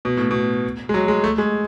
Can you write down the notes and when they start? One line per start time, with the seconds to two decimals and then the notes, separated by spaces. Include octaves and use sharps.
0.05 B2
0.17 A2
0.31 B2
0.89 G#3
0.94 F#3
1.08 G#3
1.24 A3
1.38 G#3